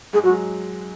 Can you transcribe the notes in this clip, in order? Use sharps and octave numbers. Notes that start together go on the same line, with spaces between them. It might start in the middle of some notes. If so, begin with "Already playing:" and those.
G#2 G#3 G#4
F#3 F#4
G#3